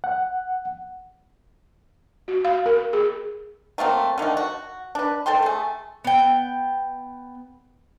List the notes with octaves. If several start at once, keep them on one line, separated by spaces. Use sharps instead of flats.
F#5
F#4
F5
A#4
G#4
F#3 A3 A#3 C4
D3 D#3 F3 A3
F#4
D4 B4
A4 C5 G5 C6
A3 G#4
B3 G5